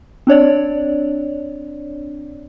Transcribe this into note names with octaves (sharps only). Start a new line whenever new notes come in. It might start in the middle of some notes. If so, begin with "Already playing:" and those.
C4 D4 C#5 D5